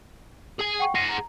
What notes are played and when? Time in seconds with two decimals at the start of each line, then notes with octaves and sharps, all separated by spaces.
0.60 G#4 G#5
0.79 F#5 G5 C#6
0.95 G#4 F#5 A#6 C7 D#7
1.09 A#5